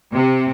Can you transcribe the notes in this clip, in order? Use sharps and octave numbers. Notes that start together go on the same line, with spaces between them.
C3